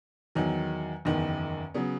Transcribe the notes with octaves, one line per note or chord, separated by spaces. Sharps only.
E2 D#3 F#3
F#1 E2 D#3
C#3 F#3 B3